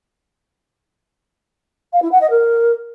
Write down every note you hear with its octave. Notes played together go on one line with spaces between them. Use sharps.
F5
E4
F#5
D#5
A#4